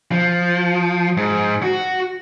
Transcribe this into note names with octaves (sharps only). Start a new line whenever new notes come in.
F3
G#2
F#4